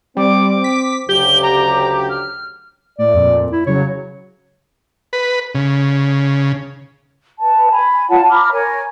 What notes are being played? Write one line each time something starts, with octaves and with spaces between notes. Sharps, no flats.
G3 C4 D6
B6
D2 C#3 F#3 G4 G7
A#5
F6
A2 D5
F2 A#2
E4
C#3 F#3 C#5
B4
C#3
B4 A5
G#5 B5
F4 C#5 F#5 A5
A#5 B5 D6 F6
A#4 C#5 G#5